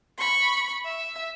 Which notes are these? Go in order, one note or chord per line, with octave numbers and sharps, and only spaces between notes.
B5 C#6
E5